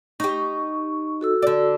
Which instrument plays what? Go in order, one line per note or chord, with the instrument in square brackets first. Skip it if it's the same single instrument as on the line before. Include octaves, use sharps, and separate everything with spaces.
[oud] D#4 G4 [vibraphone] C#6
[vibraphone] F#4 A4 E6
[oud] D3 D5